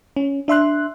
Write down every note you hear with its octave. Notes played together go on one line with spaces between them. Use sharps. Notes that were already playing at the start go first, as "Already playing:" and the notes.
C#4
D4 E5 C6 F#6